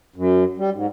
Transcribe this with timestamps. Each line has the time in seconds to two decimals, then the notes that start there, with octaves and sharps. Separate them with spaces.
0.16 F#2
0.58 G3
0.73 G#2